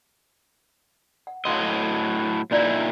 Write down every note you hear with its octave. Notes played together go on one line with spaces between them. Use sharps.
F#5
A2 F#3 D#5 F5 C6
A#2 D#4 E4 F#4 D5 E5